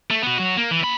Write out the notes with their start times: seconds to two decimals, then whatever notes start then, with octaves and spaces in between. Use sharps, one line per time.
0.11 A3
0.22 B3 F#4
0.38 F#3 F#4
0.57 A#3
0.71 E3
0.83 A#3 B5